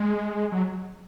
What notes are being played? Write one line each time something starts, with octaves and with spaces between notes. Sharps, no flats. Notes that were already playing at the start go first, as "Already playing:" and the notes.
Already playing: G#3
F#3